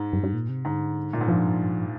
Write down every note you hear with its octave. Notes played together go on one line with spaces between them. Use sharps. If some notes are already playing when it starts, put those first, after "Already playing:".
Already playing: G#2
G2
G2
A#2
C3
G#2 D3
A#2
G#2
G2 F3